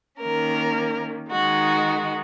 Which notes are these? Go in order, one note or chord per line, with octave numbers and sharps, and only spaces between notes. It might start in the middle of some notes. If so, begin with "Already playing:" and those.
D#3 A#3 C#4 A#4
D#3 G#3 D#4 F#4